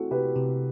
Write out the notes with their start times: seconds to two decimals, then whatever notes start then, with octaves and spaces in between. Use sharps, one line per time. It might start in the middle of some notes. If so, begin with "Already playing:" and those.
Already playing: A3 C4 E4 F#4 A4
0.11 C3 G4 B4
0.36 C3